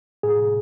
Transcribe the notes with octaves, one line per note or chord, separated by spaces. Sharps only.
A2 G#4